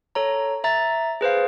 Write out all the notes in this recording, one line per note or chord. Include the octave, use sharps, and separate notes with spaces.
A4 C#5 A#5
E5 A#5 A6
G#4 B4 C5 F5